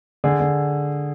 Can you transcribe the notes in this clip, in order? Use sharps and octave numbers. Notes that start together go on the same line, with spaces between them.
D3 G#4
D3